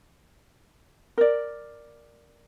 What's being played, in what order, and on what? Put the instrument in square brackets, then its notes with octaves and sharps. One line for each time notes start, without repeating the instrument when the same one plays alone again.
[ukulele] A#4 D5